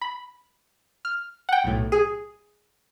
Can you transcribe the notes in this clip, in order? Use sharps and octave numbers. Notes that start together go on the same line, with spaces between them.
B5
F6
F#5 G5
B1 A2
G#4